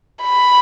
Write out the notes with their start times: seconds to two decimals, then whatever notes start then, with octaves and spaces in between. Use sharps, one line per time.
0.23 B5